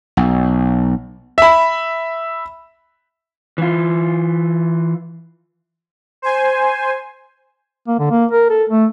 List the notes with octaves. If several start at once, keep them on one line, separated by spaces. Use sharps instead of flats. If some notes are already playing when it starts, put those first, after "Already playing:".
B1
E5 B5
E3 F4
C5 G#5
A#3
D3
A#3
A#4
A4
A3